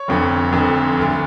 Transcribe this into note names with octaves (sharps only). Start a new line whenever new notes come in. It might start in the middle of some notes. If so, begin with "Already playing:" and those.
Already playing: C#5
F1 F2 D3
F1 F2 D3
D2 D3